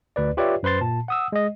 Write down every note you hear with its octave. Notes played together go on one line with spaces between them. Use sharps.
D2 B4 D5
F4 G4 B4 C#5 D5 E5
F#2 B4 C5 C6 A6
A#2 A5
F#5 D#6 E6
G#3 D#5